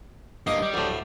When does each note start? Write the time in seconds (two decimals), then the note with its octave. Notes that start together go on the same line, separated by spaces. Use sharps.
0.47 G2 A#3 D#5
0.62 G3
0.74 D2 A2